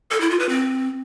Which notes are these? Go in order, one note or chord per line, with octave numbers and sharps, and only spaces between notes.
A4
E4
F4
B4
C4